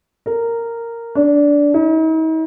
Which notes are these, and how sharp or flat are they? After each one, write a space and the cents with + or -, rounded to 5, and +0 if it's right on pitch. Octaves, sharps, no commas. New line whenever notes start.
A#4 -10
D4 -15
D#4 +45